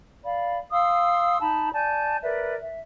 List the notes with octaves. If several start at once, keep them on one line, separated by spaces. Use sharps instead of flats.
D5 F5 B5
F5 C6 D#6 E6
D#4 A5 B5
D5 G#5 A5 G6
A#4 B4 D5 E5
E5